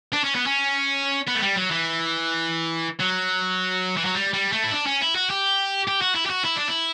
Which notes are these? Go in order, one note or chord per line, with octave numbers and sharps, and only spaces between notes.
D4
C#4
B3
C#4
B3
A3
G3
F#3
E3
F#3
E3
F#3
G3
G3
A3
E4
D4
C#4
E4
F#4
G4
G4
F#4
E4
G4
F#4
E4
D4
E4